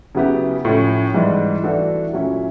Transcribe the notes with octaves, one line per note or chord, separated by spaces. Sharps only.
C#3 F#3 B3 E4 G4
A2 F3 A3 C#4
G#2 E3 G3
E3 A3 D4 F#4 A4
A#2 F#3 A3 C#4 E4